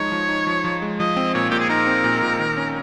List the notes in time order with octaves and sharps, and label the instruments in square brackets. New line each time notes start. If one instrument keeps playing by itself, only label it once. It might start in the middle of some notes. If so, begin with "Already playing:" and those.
Already playing: [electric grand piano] F3 G#3 D#4 [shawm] C#5
[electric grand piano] F3
D#4
F3
F3
G#3
[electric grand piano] F3 [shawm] D#5
[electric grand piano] C4
[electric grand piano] A#2 [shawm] C#5
[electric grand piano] A#2 [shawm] G4
[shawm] G#4
[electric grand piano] D#4 [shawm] A#4
[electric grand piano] C4
A#2
A#2
D#3
C#4